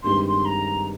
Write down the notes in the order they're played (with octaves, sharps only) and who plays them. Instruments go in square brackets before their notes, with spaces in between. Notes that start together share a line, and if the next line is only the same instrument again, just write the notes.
[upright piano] G2 D#3 G#3 C4 G4 [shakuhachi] C6
[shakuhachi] C6
A#5